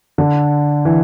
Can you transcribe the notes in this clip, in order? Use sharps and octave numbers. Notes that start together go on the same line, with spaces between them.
D3
E3